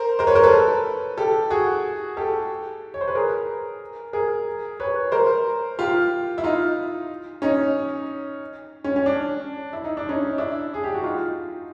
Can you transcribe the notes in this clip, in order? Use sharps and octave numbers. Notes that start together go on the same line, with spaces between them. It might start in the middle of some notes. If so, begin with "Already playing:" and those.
Already playing: A#4 C5
A#4 C5
B4 C#5
A#4 C5
A4 B4
G4 A4
F#4 G#4
G4 A4
C#5
C5
B4
G#4 A#4
G#4 A#4
B4 C#5
A#4 C5
F4 G4
E4
D#4 F4
C#4 D#4
C#4
C#4
D4
E4
D#4
D4
C#4 D#4
D4 E4
G#4
G4
F#4
D#4 F4